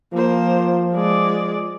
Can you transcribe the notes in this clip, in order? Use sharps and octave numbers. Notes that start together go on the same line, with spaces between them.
F3 A#3 C5
G#3 D5